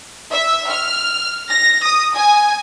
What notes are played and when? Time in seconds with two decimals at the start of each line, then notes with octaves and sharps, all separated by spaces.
0.31 E5
0.69 F6
1.49 A#6
1.83 D#6
2.15 G#5